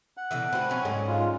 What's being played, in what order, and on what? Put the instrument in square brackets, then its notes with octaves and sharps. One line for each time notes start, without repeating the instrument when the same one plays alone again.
[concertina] F#5
[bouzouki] B2 D3 E3
[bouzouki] A2 B4 [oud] C4 F#4
[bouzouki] F#3 C#4 G#5
[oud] G#2 D3
[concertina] G#3 F4